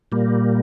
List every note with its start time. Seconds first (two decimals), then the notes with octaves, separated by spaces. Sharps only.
0.12 A#2 G3 A#3